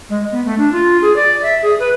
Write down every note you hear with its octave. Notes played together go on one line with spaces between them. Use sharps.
G#3
B3
A3
D4
F4
G#4
D5
E5
G#4
B4